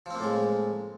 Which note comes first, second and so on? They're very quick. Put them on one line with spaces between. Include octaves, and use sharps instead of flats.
F3 C4 A#3 A2 G#3